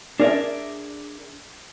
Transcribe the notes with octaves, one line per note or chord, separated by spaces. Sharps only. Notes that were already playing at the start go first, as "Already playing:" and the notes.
D4 G#4 A#4 C5 D5 E5